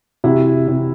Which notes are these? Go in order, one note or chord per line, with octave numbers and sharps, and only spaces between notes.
C3 E4 F#4
C3